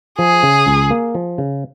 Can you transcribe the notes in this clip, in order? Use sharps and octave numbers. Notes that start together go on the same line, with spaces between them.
F3 G#4
C#3
C#2
A#3
F3
C#3